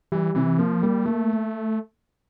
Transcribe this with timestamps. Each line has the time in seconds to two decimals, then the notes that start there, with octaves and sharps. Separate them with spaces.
0.12 E3 G3
0.35 C3 E3
0.59 F3 A#3
0.83 G3 A#3
1.06 A3 A#3